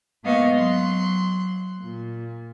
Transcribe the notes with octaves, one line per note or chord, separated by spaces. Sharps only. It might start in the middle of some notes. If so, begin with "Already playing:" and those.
G#2 A#3 B3 D#5 F5 C#6
F#3 C6 F#6
A#2